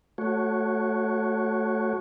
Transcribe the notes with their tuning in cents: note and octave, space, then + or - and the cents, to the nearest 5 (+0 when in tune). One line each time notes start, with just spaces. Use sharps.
A3 +0 F#4 +0 C#5 +0